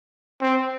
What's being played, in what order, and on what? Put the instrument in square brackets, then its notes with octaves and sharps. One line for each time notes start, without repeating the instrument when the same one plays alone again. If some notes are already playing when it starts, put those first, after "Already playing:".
[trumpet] C4